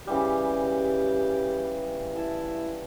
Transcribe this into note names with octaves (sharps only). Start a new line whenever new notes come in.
C#3 E3 G3 G4
E4 A5